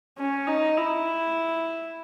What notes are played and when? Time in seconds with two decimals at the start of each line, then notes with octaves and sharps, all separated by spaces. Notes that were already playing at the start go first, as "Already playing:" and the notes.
0.18 C#4
0.47 D#4
0.77 E4